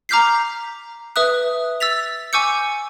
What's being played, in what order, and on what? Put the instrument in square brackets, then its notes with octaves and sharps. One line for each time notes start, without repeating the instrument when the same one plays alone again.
[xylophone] A#5 D6 F6 G6 B6 C7
B4 E5 D#6 F#6
E6 A6 B6 F7
G#5 C#6 D6 E6 G6 C#7